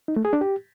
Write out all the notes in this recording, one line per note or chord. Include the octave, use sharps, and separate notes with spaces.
D#4
A3
G#4
D4
G4